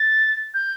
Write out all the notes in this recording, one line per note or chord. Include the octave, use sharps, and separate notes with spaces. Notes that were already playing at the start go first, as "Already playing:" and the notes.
Already playing: A6
G6